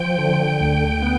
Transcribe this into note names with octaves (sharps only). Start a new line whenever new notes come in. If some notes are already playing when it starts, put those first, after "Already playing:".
Already playing: F3 G5
D3
D2
B3